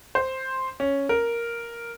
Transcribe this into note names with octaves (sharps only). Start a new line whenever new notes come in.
C5
C#4
A#4